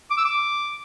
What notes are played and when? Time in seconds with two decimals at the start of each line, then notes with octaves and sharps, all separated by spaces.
0.10 D6
0.18 E6
0.25 D6